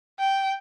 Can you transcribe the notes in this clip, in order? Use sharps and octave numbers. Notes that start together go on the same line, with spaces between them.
G5